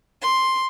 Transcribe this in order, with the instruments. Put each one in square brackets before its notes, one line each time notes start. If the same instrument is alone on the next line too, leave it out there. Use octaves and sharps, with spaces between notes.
[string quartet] C6